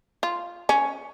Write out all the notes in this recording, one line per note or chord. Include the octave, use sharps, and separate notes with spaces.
F4
C#4